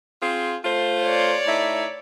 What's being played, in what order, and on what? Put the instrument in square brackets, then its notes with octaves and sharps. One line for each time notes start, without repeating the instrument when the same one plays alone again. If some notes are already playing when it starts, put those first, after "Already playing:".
[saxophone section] C4 F4 G#4
A3 F4 C5
[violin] C#5 D5
[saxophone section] A2 D#4 E5